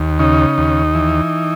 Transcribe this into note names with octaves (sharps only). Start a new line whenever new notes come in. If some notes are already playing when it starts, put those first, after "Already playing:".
Already playing: D#2
C#3 D#4
D#2
E3